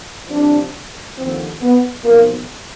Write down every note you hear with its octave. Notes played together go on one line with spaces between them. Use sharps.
C2 C3 F3 D4
D#2 D3 F3 C4
B3
B1 A#2 F3 A#3